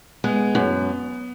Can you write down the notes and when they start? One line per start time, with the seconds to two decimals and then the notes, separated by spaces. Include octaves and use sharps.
0.24 G#3 B3
0.55 F#2